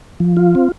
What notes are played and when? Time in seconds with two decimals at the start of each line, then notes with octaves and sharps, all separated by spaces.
0.20 F3
0.37 F4
0.55 C4